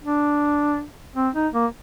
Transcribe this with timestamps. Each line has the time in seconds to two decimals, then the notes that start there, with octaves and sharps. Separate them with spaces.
0.04 D4
1.16 C4
1.35 D#4
1.53 A#3